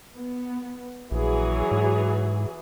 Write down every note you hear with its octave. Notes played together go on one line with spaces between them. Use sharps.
B3
A#1 E3 F#3 G#4
G#2